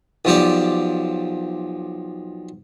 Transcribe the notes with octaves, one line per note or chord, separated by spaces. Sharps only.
B1 F3 G4 D5